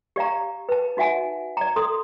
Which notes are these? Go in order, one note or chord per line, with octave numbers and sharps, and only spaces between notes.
G4 D5 F5 A#5
B4 A5
D#4 F#4 E5 F#5 G#5 A5
D5 A#5
A4 C6 D#6